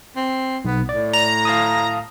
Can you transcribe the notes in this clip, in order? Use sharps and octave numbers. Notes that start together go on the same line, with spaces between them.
C4
B1 B3
A2 D5
A#5
F5 A5 D#6